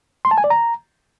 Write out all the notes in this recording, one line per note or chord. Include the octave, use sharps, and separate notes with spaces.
C6
A5
G#5
D5
A#5